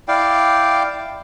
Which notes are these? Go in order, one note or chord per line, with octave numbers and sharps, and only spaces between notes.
E4 D5 F5 G5